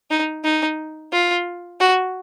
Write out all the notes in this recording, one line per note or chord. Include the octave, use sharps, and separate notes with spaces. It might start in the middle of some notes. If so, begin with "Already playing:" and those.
D#4
D#4
F4
F#4